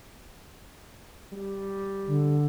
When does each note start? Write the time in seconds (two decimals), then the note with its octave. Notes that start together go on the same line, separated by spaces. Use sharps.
1.32 G3
2.06 D3